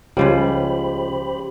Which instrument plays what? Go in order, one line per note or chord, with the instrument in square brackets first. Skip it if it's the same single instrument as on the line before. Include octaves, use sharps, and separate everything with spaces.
[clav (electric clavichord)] C#2 [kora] C#3 F3 G3 [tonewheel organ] G4 C5 B5